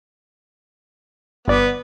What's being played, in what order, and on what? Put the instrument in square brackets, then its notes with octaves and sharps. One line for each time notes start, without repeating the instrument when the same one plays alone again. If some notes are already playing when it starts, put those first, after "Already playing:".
[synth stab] G1 D5 [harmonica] B3